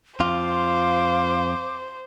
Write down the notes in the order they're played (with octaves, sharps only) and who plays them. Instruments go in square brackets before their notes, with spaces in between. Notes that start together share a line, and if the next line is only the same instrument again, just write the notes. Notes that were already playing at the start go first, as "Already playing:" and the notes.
[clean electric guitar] F2 F4 [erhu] C5 [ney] F5 [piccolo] D6